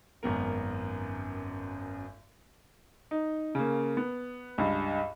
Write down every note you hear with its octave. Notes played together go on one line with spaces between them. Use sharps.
G#1 F#2 B3 A#4
D#4
C#3 A#3
B3
C#2 G2